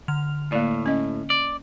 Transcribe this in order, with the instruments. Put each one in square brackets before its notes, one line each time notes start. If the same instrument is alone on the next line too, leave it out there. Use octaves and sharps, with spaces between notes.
[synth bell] D3 F6 F7
[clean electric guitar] A2 [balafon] A#3 D5
[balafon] C#4 D#5
[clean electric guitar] D5